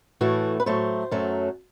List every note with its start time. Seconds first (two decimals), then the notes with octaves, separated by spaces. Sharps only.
0.21 A2 E3 A3 F#4
0.60 B4
0.66 A2 F#3 A3 C5
1.11 F#2 F#3 A3